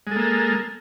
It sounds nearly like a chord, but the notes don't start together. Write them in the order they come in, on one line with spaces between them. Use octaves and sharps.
G#3 A4 A#3